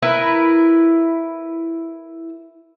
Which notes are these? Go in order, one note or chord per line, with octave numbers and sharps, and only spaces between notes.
E4 A#4 B4